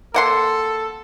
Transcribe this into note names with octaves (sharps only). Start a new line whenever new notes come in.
A#3 A4 F#5 C6